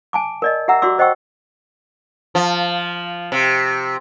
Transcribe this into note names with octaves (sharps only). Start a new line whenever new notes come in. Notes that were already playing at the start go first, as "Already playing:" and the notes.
G#5 A5 D6
A#4 D5 D#5
G4 E5 F#5 A#5 E6
F#4 G4 D5 C6 D6 E6
C5 D#5 F#5 G5 C#6 E6
F3
C3